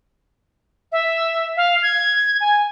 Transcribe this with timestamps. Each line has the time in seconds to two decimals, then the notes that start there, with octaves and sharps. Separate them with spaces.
0.92 E5
1.57 F5
1.83 G#6
2.41 G#5